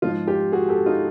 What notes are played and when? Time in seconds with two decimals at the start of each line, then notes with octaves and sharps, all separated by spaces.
0.02 G#2 F3 D#4 F4
0.27 F4 G4
0.52 F#4 G#4
0.69 G4 A4
0.86 D#4 F4